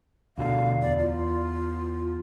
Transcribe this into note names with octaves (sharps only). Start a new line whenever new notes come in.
D2 B2 D3 F5
E2 D5
F4